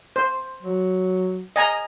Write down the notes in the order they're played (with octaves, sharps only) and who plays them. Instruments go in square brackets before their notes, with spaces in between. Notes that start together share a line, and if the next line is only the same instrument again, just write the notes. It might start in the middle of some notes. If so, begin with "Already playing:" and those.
[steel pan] C5
[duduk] F#3
[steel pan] D#5 G#5 A#5